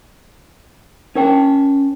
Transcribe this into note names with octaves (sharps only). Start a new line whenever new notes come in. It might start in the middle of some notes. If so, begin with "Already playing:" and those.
C#4 D4 A#4 C#5 G5 A5